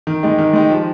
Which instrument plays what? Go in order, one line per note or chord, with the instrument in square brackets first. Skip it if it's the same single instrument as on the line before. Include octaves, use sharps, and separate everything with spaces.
[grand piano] D#3
G#3 D#4 G4
D#3
G#3 D#4 G4
F3